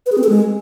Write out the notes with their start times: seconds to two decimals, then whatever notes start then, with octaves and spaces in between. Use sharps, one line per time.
0.06 B4
0.12 G#4
0.18 C4
0.23 A4
0.29 G#3